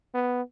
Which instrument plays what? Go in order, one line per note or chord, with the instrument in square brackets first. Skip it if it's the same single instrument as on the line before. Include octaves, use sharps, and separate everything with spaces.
[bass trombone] B3